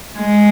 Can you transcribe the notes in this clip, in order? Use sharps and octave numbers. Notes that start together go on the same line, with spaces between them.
G#3